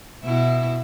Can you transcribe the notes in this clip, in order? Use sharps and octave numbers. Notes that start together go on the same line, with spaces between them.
B2 E4